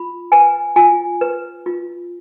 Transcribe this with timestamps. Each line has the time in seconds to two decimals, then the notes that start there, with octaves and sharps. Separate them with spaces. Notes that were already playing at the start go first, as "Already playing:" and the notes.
Already playing: F4 B5
0.32 B4 G#5
0.76 F4 G#5
1.21 B4
1.66 F4